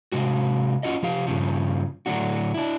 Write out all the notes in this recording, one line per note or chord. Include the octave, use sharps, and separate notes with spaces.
C3 G#3 F#4
C#4 F4 F#4 D#5
F3 G4 F5
G2 C#3 F3
A2 D3 F#3 D4 F#4
D4 E4